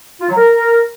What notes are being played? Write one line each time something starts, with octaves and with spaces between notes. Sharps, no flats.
F4
F#3
A#4